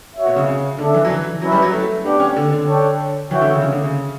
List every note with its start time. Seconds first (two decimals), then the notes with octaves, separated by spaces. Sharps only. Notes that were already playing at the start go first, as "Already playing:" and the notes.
0.16 F#4 C#5 E5
0.26 B2
0.36 C#3
0.48 C#3
0.78 D3 D4 A4 E5
0.95 E3
1.05 F#3
1.10 E3
1.42 F#3 C#4 E4 B4 E5
1.52 G3
1.62 F#3
1.73 A3
2.04 B3 D4 G4 D5 G5
2.20 C#4
2.36 D3
2.53 D3
2.68 D4 A4 C#5 G5
3.31 E3 F#4 C#5 E5 G5
3.41 D3
3.51 C#3
3.62 C#3
3.73 D3
3.83 C#3